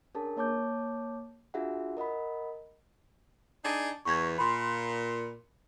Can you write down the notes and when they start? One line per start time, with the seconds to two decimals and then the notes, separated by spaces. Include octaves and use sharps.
0.15 C#4 D4 G#4 A#4 A5
0.37 A#3 C#5 A5 D6 G6
1.54 D4 F4 F#4 G#4 E5 F#5
1.97 A#4 D#5 F#5 B5
3.63 D4 D#4 G#4
4.05 E2 C#6 G#6
4.38 A#2 B5 C6